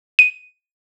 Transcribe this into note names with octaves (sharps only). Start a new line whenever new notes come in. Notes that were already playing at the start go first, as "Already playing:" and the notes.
D#7